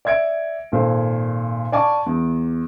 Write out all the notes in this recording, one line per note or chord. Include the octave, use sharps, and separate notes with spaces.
D5 E5 G#6 C#7 D7
G#1 A#2 A4 C5
D5 F5 G#5 A5 C#6 D6
E2